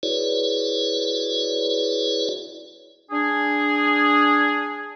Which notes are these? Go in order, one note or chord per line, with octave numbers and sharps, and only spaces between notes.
E4 F#4 G#4 B4 C#5 D5
D4 G#4